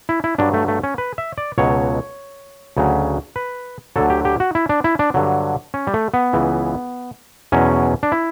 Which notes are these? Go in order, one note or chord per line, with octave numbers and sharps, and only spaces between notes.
E4
E4
G2 F#3 D4
A3
A3
C#4
B4
E5
D5
C#2 B2 F#3 C#5
D2 C#3 F#3
B4
D2 D3 F#3 A4
G4
G4
F#4
E4
D4
E4
D4
G2 D3 F#3
C#4
G3
A3
B3
C#2 C#3 E3
E2 B2 F#3 C#4
D4
E4